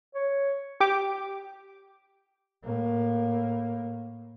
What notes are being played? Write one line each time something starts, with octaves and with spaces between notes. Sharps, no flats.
C#5
G4 D6
A2 A#3